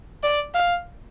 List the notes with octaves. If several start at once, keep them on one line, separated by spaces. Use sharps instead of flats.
D5
F5